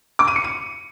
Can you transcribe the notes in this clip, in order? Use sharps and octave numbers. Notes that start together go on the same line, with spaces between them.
D6
D#7
C#7
D#7